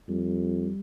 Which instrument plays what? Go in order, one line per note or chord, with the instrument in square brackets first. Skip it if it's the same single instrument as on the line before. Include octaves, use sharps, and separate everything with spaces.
[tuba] F2 [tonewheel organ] G3